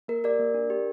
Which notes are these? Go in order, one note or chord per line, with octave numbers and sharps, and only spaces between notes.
A#3 A#4
G4 A#4 D5
A#3
D4
G4